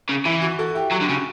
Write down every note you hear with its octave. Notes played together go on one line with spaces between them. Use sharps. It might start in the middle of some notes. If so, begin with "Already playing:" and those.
C#3
E3 E4
F#4
F#4 A4
E4 G4
F#3 F#4
D3
C#3 F#4